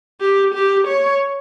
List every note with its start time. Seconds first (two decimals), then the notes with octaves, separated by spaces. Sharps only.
0.21 G4
0.54 G4
0.87 C#5